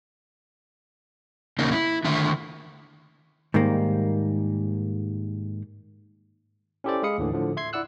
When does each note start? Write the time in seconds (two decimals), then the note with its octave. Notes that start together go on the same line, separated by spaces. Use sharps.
1.59 E2 A#2 C#3 A#3 D#4
1.73 E4
2.04 D3 D#3 A3 E5
3.54 G#2 D#3 G3 A#3
6.84 C#4 E4 G4 A4 C5 D5
7.03 G#3 G#4 F5 B5 D#6 C#7
7.18 D#2 A2 D3 E3
7.33 A2 D3 F3
7.57 E5 C6 G#6 C7
7.73 E4 D5 F#5 E6 F#6